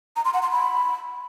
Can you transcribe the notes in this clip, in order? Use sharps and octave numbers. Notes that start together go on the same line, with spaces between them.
A#5
C6
F#5
C6
B5